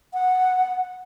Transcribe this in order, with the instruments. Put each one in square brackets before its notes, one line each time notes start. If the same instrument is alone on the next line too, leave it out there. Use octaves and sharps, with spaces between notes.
[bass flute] F#5